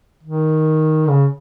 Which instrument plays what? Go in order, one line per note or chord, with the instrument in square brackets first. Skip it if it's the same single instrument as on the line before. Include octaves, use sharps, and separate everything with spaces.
[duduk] D#3
C#3